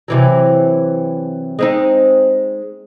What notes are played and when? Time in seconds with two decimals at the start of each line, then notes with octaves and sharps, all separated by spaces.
0.08 C3 E3 F#3
1.59 G#3 C4 D#4